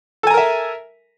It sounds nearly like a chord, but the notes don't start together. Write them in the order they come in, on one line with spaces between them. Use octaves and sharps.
A4 G#5 A#5 A#4 E5